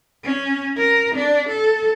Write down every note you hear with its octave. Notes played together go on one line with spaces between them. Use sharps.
C#4
A#4
D4
A4